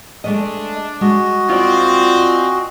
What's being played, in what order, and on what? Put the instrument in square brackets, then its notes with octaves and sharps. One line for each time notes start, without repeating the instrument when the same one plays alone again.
[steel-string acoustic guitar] G#3 A3 D#5 [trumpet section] D4
[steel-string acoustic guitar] G#3 [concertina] F#4 D#5
[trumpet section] C4 [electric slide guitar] F4 D5
[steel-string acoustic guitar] G#5